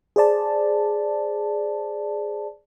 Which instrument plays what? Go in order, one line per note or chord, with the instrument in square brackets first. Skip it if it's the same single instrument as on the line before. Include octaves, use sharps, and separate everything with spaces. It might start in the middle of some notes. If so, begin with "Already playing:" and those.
[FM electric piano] G#4 C5 D5 A5